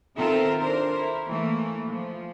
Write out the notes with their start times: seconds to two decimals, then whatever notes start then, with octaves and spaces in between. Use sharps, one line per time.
0.17 D#3 C4 F4 A4 A#4 E5
0.60 D4 A#4 C5
0.95 E4
1.29 E3 A3 A#3
1.89 F3